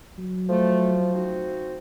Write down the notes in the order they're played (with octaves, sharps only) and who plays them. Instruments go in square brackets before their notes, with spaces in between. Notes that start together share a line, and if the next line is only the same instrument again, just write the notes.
[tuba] F#3
[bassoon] F3 [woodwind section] A3
[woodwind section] C4 D#4 F#4